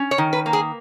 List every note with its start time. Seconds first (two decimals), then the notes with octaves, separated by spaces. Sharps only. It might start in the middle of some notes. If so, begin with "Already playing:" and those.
Already playing: C#4
0.11 C#5
0.18 D#3
0.33 B4
0.46 A#3
0.53 G#4